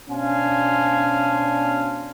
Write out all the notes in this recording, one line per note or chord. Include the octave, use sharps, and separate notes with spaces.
B2 C#4 D4 C5 F5 G#5